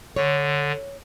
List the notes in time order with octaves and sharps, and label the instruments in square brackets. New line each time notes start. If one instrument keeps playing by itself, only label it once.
[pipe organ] D3 [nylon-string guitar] C#5